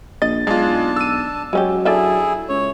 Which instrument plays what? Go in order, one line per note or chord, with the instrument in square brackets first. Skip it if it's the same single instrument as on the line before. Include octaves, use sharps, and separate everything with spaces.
[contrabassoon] A#1 [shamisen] D#5 [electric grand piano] A6
[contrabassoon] B1 [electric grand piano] G#3 F4 [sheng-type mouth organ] D4 A5 [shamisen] D#4
[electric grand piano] E6 D#7
[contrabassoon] F#3 [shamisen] G#3 C#4 G4
[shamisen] D4 A4 E5 [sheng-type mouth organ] E4 G#4
[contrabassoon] C#2 [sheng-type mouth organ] C#5